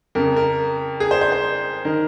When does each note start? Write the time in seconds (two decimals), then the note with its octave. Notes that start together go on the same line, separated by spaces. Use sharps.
0.15 F2 C#3 A#4
0.36 A#4
1.00 G#4
1.11 C5
1.21 C5
1.32 C5
1.85 D#3 A#4